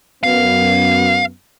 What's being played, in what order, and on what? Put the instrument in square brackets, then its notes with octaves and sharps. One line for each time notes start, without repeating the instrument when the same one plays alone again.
[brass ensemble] F#2 B3 [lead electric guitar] F5